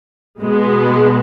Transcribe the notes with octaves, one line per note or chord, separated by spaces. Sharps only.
B2 G#3 B3